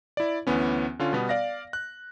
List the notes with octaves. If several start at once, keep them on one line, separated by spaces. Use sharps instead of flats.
E4 D5
D2 E3 B3 C#4
D3 C#4 F4
B2 G3 B3
D5 F5 A#6
F#6